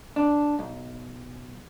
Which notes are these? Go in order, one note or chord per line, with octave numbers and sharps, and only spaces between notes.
D4
B1